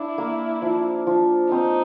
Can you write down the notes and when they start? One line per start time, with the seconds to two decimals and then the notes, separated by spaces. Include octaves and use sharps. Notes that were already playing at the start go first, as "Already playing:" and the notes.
Already playing: D4 E4
0.18 A#3
0.62 F3
1.07 F3
1.51 C4 D#4